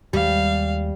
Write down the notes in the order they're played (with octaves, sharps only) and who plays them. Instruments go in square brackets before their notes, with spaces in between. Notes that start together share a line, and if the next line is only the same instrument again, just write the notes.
[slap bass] D#2 G#3 [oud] G3 [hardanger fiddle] F5